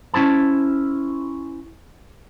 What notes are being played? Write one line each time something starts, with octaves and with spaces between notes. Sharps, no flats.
C#4 E4 C5 A5